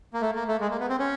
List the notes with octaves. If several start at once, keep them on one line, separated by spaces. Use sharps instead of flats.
A#3
A3
A#3
A3
G#3
A#3
B3
C4
C#4